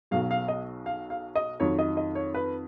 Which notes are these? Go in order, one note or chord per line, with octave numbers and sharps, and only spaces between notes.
B1 B2 F#3 F5
F5
D#5
F5
F5
D#5
F2 D#3 F#3 C#5
D#5
D#5
C#5
B4